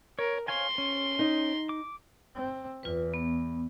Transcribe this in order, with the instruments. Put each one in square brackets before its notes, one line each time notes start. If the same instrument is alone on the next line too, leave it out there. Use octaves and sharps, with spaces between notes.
[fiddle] A#4 [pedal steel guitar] C#5
[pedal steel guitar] C#5 F5 G#5 [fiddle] C6
[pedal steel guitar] C#4
[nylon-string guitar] D#4
[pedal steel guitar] D6
[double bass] C4
[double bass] E2 [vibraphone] F4 B4
[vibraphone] B3